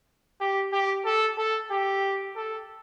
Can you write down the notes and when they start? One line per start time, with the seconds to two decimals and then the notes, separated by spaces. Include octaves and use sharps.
0.41 G4
0.73 G4
1.05 A4
1.38 A4
1.71 G4
2.36 A4